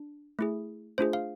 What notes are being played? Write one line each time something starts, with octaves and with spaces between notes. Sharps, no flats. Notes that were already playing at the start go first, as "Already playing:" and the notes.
Already playing: D4
A3 E4 G#4
A3 D4 F4 G#4 C5
F5